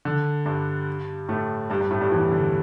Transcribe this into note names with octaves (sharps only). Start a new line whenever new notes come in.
D3
G2 G3
A2 A3
G2 G3
G2 G3
A2 A3
G2 G3
E2 E3
D3